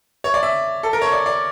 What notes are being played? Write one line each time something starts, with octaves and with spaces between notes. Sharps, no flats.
C#5
D5
E5
A4
A#4
C#5
D5
D5